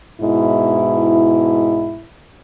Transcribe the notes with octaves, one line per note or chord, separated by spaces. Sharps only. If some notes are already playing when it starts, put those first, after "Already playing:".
G#2 B2 E4